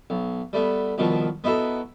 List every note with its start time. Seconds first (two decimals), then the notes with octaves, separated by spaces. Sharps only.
0.10 B1
0.53 G3 A3 B3
0.98 C2 B2 D#3 F3
1.44 B3 D#4 E4 F#4 A4